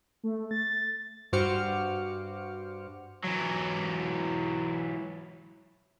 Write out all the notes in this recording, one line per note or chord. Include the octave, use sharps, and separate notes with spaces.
A3
A6
G2 F#4 C5 D6 F6 C#7
E3 F#3